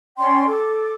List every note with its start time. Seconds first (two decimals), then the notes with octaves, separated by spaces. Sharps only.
0.17 C#4 D5 G5 C6
0.48 A4 D6